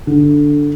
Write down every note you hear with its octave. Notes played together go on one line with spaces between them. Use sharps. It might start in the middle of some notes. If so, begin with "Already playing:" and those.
D3